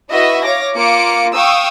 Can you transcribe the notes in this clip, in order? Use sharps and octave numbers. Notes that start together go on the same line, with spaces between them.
E4 F#4 B4 D#5 E5
C#5 F5 D6 A#6
A#3 F4 D6 C#7 D7
F5 G5 C#6 D#6 E6